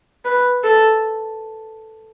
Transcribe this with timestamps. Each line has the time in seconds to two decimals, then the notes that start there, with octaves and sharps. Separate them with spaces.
0.25 B4
0.64 A4